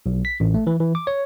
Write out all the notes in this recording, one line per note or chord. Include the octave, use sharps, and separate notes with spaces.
B1
B6
A1
A3
E3
E3
D6
C#5